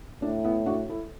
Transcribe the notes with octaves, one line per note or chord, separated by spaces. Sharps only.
A2 D4
B3 E4
D4 F#4
E4 A4